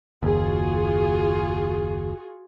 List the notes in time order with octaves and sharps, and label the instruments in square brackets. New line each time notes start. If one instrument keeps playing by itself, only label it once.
[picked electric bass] F#1 D#2 [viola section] F4 F#4 G#4